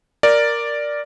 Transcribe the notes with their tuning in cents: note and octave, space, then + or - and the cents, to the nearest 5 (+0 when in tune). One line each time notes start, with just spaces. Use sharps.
A#4 +0 D5 +0